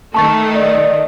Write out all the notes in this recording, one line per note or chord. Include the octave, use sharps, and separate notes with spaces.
D#3 A3 A5 C#6 A6
D5 D#5